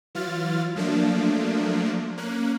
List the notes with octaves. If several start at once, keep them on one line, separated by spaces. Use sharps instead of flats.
E3 F#3 F4 F6 A6
F3 F#3 A3 A#3 D4
A#3 C#4 F#6